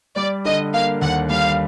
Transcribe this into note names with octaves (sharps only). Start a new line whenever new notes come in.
G3 D5
D3 D#5
A#3 F5
D#2 F#5
G3 F5